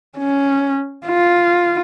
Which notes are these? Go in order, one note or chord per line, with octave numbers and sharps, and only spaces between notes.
C#4
F4